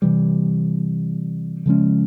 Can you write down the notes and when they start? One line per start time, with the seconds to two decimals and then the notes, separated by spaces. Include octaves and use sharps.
0.02 C3 E3 G3
1.66 C#3 F3 G#3 C#4